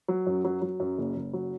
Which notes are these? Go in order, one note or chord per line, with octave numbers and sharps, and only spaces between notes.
F#3
F#2
F#3
F#3
F#2
F#1
F#1
F#3